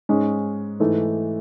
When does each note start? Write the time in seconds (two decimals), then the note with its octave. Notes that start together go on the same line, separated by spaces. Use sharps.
0.09 G#2 G#3 C#4
0.80 G#2 E3 A3